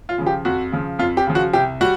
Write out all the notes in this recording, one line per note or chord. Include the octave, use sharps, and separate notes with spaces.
F4
C#3 F3
G4
F2 F#4
C#3 F3
F2 F4
G4
C#3 F3
F#4
C2 G4
G3 F#4